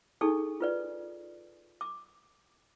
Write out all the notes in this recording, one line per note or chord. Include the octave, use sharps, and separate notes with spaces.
D4 D#4 G#4 A4 C#6
F4 B4 D5
D6